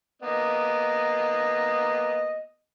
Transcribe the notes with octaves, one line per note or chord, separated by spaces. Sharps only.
A#3 B3 D#5